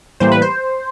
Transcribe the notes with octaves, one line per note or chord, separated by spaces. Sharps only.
A2 E3 G3 A#3 C5
B4
C5